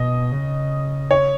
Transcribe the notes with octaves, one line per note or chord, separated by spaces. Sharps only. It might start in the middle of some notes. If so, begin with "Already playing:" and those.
Already playing: B2 D#5
C#3
C#5